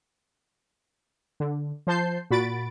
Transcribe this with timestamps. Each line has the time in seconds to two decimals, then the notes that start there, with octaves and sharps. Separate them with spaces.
1.40 D3
1.87 F3 C5 A5 G6 C7
2.30 A#2 F#4 B5 A6 D7